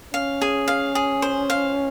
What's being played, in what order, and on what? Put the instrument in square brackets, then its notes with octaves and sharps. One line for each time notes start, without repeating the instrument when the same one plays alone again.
[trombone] C#4 [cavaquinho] F5
[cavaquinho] G#4
F5
G#4
C5
F5